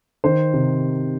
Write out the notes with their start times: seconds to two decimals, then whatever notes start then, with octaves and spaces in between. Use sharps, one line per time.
0.24 D#3 C5
0.54 C3